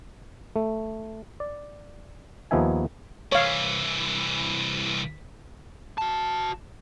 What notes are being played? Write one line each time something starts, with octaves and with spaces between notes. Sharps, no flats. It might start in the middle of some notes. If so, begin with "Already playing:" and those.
A3
D5
D#2 F3 B3 D#4 E5 G#5
C2 E3 C#5 F5
F#4 A5